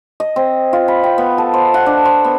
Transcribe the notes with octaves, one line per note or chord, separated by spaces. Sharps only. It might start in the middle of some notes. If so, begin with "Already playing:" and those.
D#5
C4
F4
B5
G5
B3
A4
C5
F#5
D4
C5
B3